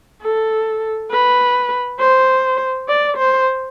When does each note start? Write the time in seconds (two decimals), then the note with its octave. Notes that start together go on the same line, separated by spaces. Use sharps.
0.22 A4
1.11 B4
1.99 C5
2.89 D5
3.18 C5